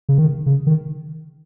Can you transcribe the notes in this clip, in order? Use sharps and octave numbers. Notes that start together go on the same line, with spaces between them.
C#3
D#3
C#3
D#3